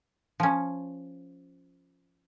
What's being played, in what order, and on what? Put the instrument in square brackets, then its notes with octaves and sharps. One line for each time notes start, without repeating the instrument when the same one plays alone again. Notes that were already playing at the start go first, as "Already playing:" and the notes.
[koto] F3 C#4